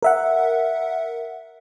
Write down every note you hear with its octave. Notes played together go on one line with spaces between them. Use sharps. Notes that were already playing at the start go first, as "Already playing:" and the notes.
A#4 E5 F#5